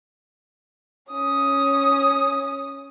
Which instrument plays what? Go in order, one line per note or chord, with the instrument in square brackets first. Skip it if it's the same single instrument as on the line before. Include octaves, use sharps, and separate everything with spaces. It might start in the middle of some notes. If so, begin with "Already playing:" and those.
[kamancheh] C#4 D#6